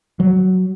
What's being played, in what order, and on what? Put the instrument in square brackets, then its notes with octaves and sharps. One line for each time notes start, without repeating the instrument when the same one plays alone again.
[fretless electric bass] F#3